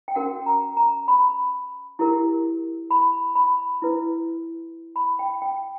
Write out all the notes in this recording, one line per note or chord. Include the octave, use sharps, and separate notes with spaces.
G5
C#4 F#4 A#4 F#5
A#5
A#5
B5
E4 G4 A#4
B5
B5
E4 B4
B5
G5
G5